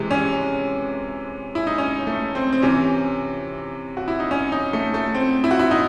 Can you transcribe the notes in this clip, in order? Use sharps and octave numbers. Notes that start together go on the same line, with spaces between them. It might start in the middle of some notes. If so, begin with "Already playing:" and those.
Already playing: C3 E3 G#3
C#4
E4
D#4
C#4
A3
C4
C4
C3 E3 C#4
F#4
E4
D#4
C#4
D#4
A3
A3
C4
E4
F#4
E4
D#4